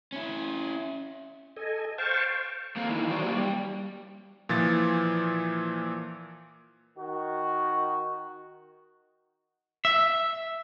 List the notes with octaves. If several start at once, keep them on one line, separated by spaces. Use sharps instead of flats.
C#4 E4
A4 D#5 G#5
C5 F5 G5 A5 C#6
A3 A#3 C4 F5
D#3 E3
F#3 F#4 B4 C5 D5 G5
A#3 G4 B4 G5
G3
A#2 E3 F3 A6
D#3 F#4
E5